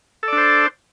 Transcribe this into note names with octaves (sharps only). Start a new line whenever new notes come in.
D4 A4 C5 D5